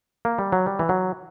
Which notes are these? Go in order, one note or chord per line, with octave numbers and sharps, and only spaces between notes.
A#3
G3
F#3
G3
E3
F#3